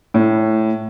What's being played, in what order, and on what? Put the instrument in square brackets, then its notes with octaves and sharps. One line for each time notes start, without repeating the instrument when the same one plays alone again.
[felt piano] A2